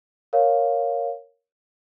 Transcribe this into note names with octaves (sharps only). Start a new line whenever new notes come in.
A#4 C#5 F5